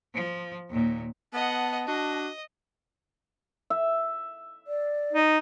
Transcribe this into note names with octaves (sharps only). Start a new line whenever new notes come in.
F3
D#2 A#2
B3 D#5 F#5 A5
D4 F#4 D#5
E5
D5
D#4